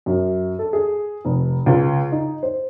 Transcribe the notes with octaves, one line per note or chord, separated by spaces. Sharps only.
F#2
A4
G#4
F1
C#2
D#4
C5